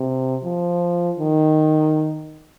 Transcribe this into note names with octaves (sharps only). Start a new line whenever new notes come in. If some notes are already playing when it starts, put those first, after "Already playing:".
Already playing: C3
F3
D#3